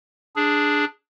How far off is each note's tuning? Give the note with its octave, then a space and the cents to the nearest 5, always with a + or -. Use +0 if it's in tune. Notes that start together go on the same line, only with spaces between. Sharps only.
D4 +0 G#4 +0